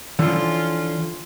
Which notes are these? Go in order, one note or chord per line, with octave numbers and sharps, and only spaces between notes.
D3 E3 F3 C#4 F4